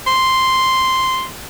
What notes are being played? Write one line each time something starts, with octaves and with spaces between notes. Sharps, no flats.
C6